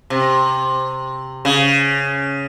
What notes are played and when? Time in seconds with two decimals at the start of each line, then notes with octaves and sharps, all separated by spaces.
0.10 C3
1.45 C#3